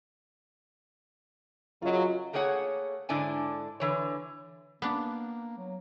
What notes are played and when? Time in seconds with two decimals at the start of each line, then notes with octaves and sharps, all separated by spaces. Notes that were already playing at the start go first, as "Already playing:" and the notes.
1.82 F#2 C#3 F#3 F4 D#5
2.33 A3 A#3 G#4 C#5 F#5
3.09 G#2 D3 D4 E4 G#5
3.80 D3 E3 C#5
4.82 A#3 B3 D4
5.58 F#3